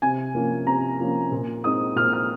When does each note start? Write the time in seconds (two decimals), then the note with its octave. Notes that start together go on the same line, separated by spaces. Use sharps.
0.02 C3 G#5
0.35 F3 A#3 C#4
0.67 C3 A#5
1.00 F3 A#3 C#4
1.32 A#2
1.64 G#3 C4 D#4 D#6
1.96 A#2 F6
2.13 F6